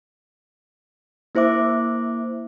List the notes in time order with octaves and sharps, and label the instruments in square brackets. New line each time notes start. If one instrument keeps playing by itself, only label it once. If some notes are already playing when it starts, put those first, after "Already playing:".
[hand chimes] A#3 E4 C5 E5 D6